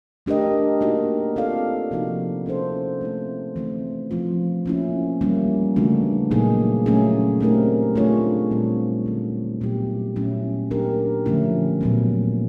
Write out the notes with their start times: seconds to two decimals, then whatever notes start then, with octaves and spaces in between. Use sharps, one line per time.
0.26 A3 D4 G4 A#4 D#5
0.81 A#3 D#4 F#4 A#4
1.36 C4 F4 A4 D5 F5
1.91 C3 F3 A#3 D#4 F#4
2.46 C#4 E4 A4 C5
3.01 A3 C4 E4
3.56 E3 A3 C4 E4
4.11 F3 A3 C4 F4
4.66 A#3 C#4 E4
5.21 E3 G3 A#3 C#4 E4
5.76 C#3 E3 A3 D4 F#4
6.31 A#2 F#3 A#3 D#4 G#4
6.86 F#3 A3 C#4 E4 G#4
7.41 A3 C4 D#4 G4 A#4
7.95 A3 D4 F4 G#4 C#5
8.51 A#2 G3 C4
9.06 D3 F#3 A3
9.61 A#2 F#3 B3 E4 G4
10.16 A#2 F#3 A3 C#4 E4
10.71 F#3 A#3 D4 G4 A#4
11.26 D3 F3 A3 C#4 E4
11.81 A#2 F#3 B3